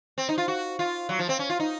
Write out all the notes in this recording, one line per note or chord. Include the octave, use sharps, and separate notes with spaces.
C4
D#4
F4
F#4
F4
F#3
F3
C4
C#4
F4
D#4